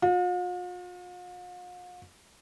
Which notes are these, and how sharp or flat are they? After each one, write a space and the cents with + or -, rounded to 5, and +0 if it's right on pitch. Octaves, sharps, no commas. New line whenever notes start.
F4 +45